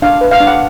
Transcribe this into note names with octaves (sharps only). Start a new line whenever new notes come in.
D4 F5
B4
F5
D4
F#5